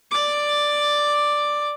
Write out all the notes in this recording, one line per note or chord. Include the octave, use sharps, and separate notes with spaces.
D5 D6